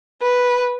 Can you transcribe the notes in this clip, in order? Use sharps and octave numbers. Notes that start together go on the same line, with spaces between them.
B4